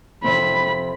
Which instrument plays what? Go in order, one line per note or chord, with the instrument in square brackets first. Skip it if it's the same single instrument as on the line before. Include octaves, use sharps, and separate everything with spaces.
[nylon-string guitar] F2 C3 C4 [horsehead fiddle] B5